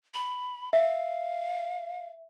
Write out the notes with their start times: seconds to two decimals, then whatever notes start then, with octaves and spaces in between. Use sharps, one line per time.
0.14 B5
0.73 E5 F5